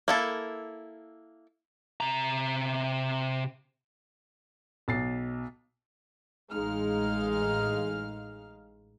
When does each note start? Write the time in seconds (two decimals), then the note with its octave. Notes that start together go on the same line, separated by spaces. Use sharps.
0.08 A#3 E4 A4
2.00 C3 A#5
4.88 B1 A6 C7
6.51 A1 G#3 D#4 F5 F6